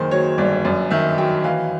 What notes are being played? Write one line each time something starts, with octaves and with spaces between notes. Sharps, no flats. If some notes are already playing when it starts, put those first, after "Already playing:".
Already playing: F#1 D#3 C5
F#3 C#5
G1 D5
F#2 D5
D#3 E5
F#3 G5
E3 F5